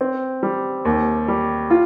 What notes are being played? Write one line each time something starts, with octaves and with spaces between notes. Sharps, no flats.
C4
G3
D#2
G3
F4